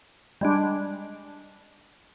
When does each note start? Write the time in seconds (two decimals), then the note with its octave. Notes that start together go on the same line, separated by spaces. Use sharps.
0.41 G3 G#3 D4